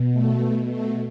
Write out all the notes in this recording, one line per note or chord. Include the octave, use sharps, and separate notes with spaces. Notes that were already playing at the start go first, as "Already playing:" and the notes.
Already playing: B2
A3
A3